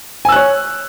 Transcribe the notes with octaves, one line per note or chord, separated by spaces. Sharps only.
C#5 G#5 E6 F#6